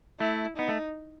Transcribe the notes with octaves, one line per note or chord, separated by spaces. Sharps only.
A3 E4
B3 D#4
A3